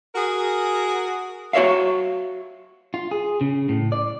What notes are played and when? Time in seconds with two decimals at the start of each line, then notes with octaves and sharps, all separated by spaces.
0.15 F#4 G#4 A#4
1.53 F#4 C#5 D5 E5 F5
2.94 F4
3.11 G#4
3.41 C#3
3.69 A2
3.92 D5